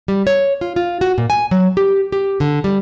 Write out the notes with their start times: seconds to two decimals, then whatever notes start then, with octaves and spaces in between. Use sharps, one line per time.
0.08 G3
0.27 C#5
0.61 F4
0.76 F4
1.01 F#4
1.18 A#2
1.30 G#5
1.51 F#3
1.77 G4
2.12 G4
2.40 D3
2.64 G3